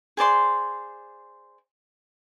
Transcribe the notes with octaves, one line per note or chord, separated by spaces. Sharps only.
G#4 C5 D5 C6